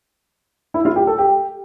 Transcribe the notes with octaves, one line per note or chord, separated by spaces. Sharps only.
E4
F4
G4
A4
G4